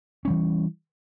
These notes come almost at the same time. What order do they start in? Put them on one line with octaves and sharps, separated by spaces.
C#4 G3 E3